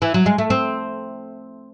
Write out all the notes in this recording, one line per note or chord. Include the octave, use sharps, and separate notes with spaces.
E3
F#3
G#3
A3
C4